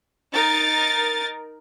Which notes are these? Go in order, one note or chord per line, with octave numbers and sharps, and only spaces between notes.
D#4 A#4 A6